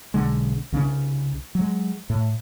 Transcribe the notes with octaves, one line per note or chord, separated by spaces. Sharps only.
B1 D3 G#3
C2 C#3 G#3 D4
F#3 G#3
A2